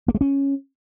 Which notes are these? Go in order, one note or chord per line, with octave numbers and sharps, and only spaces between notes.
A#3
G#3
C#4